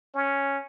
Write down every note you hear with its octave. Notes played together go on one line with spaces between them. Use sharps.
C#4